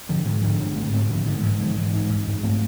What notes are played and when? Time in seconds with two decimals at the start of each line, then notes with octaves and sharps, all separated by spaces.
0.09 G#2 D3 F3
0.25 G#2 E3 G#3
0.42 G#2 D3 F3
0.59 G#2 D3
0.75 G#2 A3 C4
0.93 G#2 A3 C4
1.09 G#2 D3 F3
1.26 G#2 D3
1.42 G#2 E3
1.60 G#2 D3 F3
1.77 G#2 E3 G#3
1.94 G#2
2.10 G#2
2.27 G#2
2.43 A3 C4